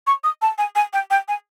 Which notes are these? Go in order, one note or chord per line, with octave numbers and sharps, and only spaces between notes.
C#6
D#6
A5
G#5
G#5
G5
G5
G#5